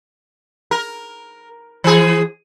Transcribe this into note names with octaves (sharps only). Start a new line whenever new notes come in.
A#4
E3 G#4